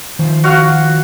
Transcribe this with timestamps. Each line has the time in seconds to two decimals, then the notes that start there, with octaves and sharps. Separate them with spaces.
0.19 D#3 F3 C5
0.44 F#4 F5